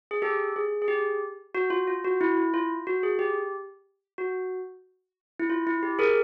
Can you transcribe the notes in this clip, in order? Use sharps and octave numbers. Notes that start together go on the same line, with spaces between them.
G#4
G4 A4
G#4
G#4
G4
F#4
F4
F4
F#4
E4
E4
F4
F#4
G#4
G4
F#4
E4
F4
E4
G4
G#4 A#4